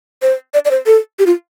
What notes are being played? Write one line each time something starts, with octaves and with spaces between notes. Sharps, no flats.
C5
D5
D5
C5
A4
G4
F4